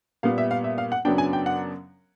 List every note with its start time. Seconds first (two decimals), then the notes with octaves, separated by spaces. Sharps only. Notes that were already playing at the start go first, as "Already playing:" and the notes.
0.23 A#2 G3 B3 F5
0.38 E5
0.51 F5
0.64 E5
0.78 F5
0.92 F#5
1.05 F#2 C#3 F#3 B3 D4 G5
1.18 G#5
1.33 G5
1.46 F#5